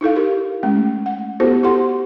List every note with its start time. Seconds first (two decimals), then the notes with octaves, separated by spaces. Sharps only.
0.01 D#4 E4 A4 F5
0.16 G4 A#4
0.63 G#3 A3 C#4
1.06 F#5
1.40 B3 E4 F#4 G4 A4 C5
1.63 E4 G4 A4 F#5 C6